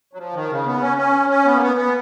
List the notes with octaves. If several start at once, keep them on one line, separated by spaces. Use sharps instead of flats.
F#3
F3
D#3
C#3
B3
C#4
C#4
C#4
B3
A#3
B3
B3